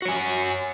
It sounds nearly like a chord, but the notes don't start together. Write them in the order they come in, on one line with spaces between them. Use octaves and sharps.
F#4 C#5 G#5